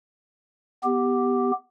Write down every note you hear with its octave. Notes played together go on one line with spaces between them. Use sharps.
B3 G4